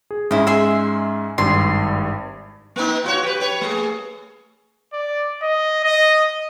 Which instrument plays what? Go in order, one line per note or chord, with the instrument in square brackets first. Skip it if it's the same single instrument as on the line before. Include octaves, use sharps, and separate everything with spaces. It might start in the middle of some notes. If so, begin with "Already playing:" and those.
[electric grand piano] G#4
[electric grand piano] G#2 G#3 C#4 [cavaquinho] E4 D#5
[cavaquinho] G#4 E5 C6
[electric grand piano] G#1 G2 [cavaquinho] C6
[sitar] A#3 B3 D#4
F4 F#4 C#5
G4 B4
B4 C#5
A3 G#4
[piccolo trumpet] D5
D#5
D#5